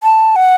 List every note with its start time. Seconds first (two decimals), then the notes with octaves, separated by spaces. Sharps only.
0.03 A5
0.36 F#5